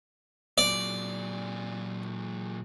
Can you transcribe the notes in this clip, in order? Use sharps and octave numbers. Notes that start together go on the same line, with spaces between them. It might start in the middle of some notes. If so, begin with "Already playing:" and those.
A#2 F#3 D5